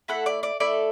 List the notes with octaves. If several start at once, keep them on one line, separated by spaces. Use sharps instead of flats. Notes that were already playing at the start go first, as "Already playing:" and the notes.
A3 E4 A4 F#5
D5
D5
A3 E4 A4 D5